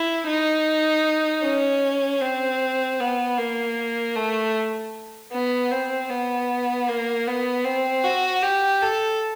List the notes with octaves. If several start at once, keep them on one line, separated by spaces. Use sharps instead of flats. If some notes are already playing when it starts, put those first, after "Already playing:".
Already playing: E4
D#4
C#4
C4
B3
A#3
A3
B3
C4
B3
A#3
B3
C4
F#4
G4
A4